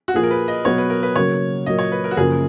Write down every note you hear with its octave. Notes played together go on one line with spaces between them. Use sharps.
F#4
A#2 F3 A#3 F4 G#4
A#4
B4
D#5
B2 F#3 B3 C#5
B4
A#4
B4
C#3 F#3 A#3 C#5
A#2 F#3 A#3 D#5
C#5
B4
A#4
F#4
F#2 C#3 F3 A#3 G#4